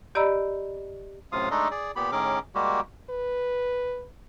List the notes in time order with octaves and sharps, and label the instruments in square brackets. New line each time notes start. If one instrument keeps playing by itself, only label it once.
[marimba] G4 D5 D#5 A#5 B5 E6
[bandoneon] F#2 A2 C3 F4 F5 D#6
G#3 A3 D4 D#4 A4 D#5
G#4 D5
A#2 B3 G4 B5
A2 D#3 C#4 G#4 A#4 D6
G3 G#3 A#3 F#4 G4
[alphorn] B4